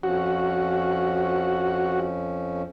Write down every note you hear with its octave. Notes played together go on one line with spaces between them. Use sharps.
F2 F3 C#4 F#4